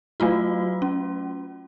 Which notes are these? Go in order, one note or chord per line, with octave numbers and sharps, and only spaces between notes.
F#3 A3 F4 F#4
C#4